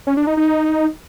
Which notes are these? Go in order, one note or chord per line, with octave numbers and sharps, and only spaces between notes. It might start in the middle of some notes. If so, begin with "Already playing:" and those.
C#4
D4
D#4
D#4